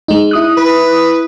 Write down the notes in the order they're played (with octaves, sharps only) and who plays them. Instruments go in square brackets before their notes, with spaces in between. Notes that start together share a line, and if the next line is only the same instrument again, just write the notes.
[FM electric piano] G#3 D#4
E4 D#6 F#6
[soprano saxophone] B4